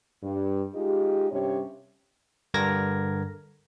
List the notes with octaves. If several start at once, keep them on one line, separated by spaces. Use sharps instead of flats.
G2
G#3 D#4 F4 G4
G2 C3 G3 C#4 G4 C#5
G2 D3 A#4 G#6 A#6